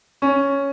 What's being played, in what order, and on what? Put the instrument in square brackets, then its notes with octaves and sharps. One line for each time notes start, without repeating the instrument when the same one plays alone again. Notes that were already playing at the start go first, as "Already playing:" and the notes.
[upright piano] C#4 [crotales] C#6